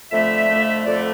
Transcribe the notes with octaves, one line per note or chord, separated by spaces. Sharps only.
F2 D3 A3 E5
F2 D3 A3
F2 D3 A3 D5